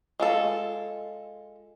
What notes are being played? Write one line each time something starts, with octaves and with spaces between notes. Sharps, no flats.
G#3 F4 A4